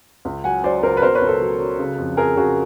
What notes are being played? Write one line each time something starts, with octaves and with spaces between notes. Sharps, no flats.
C#2
F#3 F#5 G#5
F#3 C5 D5
C#2 A#4 C5
B4
B2 A#4 C5
B4 C#5
C#2
A4 B4
F#3
F#3
C#3
F2
F2 G#4 A#4
C#3 F#4 G#4